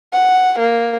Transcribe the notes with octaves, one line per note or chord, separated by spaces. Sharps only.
F#5
A#3